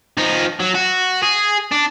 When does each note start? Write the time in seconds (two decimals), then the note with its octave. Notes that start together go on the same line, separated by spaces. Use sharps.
0.18 F3 D#4
0.60 F#3
0.75 F#4
1.23 G#4
1.72 D4